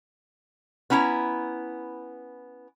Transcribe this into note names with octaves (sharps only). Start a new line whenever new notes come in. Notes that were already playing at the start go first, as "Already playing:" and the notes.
B3 C#4 E4 F#5 A#5